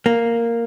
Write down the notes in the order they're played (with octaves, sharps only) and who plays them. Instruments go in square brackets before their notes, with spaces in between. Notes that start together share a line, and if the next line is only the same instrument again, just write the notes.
[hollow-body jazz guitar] A#3